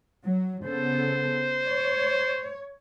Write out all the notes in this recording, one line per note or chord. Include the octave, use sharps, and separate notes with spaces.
F#3
C#3 B3 A4 C5
C#5